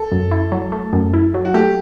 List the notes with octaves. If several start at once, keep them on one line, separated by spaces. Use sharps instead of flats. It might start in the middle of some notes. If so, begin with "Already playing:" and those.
Already playing: A4
F#2
E4
F#3
A3
F#2
E4
F#3
F#4
A3 G4